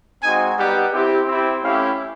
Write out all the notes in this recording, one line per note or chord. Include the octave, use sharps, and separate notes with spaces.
G#3 C4 D#4 F#4 G#5
G3 B3 D#4 G4 F#5
C4 E4 G4
C4 E4 G4
A3 C#4 E4 G4 F5